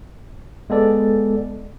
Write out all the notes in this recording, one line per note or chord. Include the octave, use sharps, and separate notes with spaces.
G#3 B3 A4 D5